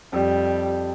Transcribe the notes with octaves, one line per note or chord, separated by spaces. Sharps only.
F2 G3